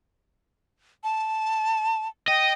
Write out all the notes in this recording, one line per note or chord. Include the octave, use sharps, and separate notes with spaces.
A5
D#5 G5